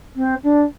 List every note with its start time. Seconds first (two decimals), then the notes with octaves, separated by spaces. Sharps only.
0.15 C4
0.43 D4